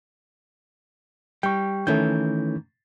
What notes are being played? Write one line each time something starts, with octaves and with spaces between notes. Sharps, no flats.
G3 G5 C#6
D#3 E3 A3 C#4 G6